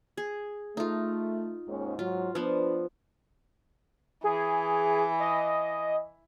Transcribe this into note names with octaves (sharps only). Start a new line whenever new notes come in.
G#4
A3 D#4 F4
D#2 G#2 C#4
G#2 F#3 F4
F3 B3 D4 B4
E3 G#4
D#5